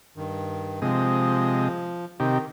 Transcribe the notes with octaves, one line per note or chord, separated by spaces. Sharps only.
G2 D#3
C3 F3 G#3 D#5
C3 D#3 D#4 G4